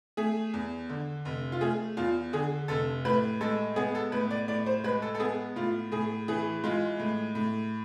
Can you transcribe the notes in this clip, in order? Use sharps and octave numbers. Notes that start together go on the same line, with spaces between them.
A3 G#4
E2
D3
F1
F4
A3 G#4
E2 F4
D3 G#4
F1 A4
A2 B4
G#3 A4
B3 G#4
A4
A2 B4
D5
A2 D5
C5
G#3 B4
A4
A4
B3 G#4
A2 F4
A2 G#4
E3 G#4
G#3 F4
A2
A2